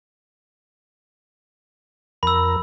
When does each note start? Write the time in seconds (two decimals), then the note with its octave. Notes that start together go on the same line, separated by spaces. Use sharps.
2.23 F2 A#4 B5 E6